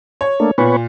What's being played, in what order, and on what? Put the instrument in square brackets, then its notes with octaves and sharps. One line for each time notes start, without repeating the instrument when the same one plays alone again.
[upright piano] C#5
[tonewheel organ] A3 A#3 D4
[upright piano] A#2 [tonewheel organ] B3 B4 C#5